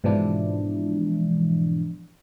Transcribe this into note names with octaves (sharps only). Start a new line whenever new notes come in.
G#2 B2 E3 F3 D4 E4